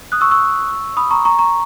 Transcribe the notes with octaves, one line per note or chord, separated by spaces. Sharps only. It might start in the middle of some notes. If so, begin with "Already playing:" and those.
D#6 F#6
C#6 E6
C#6 E6
B5 D#6
A#5 C#6
A#5 C#6
A#5 C#6